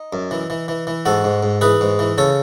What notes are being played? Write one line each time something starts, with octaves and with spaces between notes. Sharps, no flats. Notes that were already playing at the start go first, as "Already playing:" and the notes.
Already playing: D#4
F#2
E3
E3
E3
E3
G#2 F#4 A4
G#2
G#2
E3 G#4 B4
G#2
E3
C#3 A4 C#5